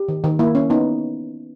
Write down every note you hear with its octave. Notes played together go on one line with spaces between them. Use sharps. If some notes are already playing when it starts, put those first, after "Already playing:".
Already playing: G4
D#3
D#3
A#3 E4
C#4
B3 D#4